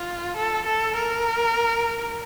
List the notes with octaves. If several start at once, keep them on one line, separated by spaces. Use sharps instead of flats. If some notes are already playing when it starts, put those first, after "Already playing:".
Already playing: F4
A4
A4
A#4